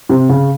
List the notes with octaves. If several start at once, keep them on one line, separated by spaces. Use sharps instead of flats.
C3
C#3